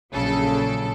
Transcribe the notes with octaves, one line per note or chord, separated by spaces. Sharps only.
A#1 C#3 F#3 A4